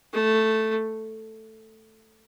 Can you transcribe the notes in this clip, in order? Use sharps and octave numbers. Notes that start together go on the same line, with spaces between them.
A3